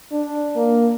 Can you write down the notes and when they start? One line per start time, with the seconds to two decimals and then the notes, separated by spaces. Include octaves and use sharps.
0.12 D4
0.56 A#3